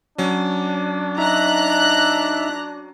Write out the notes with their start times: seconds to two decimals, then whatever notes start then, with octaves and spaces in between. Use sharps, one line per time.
0.18 F#3 C#4 D4
1.18 D#4 E5 A#5 F#6